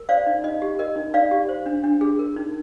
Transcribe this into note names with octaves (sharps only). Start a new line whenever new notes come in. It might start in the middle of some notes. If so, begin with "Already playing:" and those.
Already playing: A#4
C5 D5 F5
D#4
D#4 D#5
G4
A#4 D#5
D#4
D#4 D5 F5
G4
C5
D4
D4
G#4
A#4
D#4